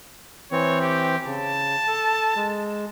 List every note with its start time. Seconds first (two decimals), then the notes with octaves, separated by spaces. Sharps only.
0.52 E3 C4 C#5
0.81 G4
1.26 C#3 A5
1.88 A4
2.36 G#3